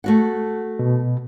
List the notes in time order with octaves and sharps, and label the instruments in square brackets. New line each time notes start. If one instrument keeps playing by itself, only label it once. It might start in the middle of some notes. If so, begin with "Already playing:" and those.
[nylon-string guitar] A3 F#4 F#5
[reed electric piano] B2